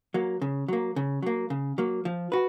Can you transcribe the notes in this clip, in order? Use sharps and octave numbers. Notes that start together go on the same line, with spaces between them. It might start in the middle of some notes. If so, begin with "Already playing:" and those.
F#3 A#3
C#3
F#3 A#3
C#3
F#3 A#3
C#3
F#3 A#3
F3
F#4 B4